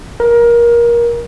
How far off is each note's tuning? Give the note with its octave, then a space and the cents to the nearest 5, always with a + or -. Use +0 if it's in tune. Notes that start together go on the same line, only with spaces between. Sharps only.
A#4 +20